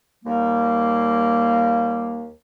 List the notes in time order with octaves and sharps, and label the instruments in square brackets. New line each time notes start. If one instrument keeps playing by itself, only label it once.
[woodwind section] D#2 G3 A#3